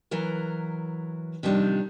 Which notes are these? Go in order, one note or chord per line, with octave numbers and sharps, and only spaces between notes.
E3 F#3 A#4
C3 D#3 F3 G3 D4